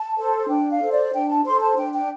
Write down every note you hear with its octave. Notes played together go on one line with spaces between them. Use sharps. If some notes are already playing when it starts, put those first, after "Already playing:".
Already playing: A5
A4 C5
D4 G5
F5
A4 C5
D5
D4 G5
A5
A4 C5 C6
A5
D4 G5
G5